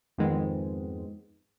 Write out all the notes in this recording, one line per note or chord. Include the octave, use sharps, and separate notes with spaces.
F2 G#2 D#3 G#3 B3 C4